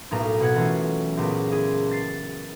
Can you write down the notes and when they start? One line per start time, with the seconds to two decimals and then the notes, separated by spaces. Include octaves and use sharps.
0.11 B1 A2 A#3 A#5
0.40 B2 F#5 G#6
0.55 E3 F#3 A3 C#4 F4
1.17 C#2 A#2 B3
1.51 E4 G#4
1.91 A6 C7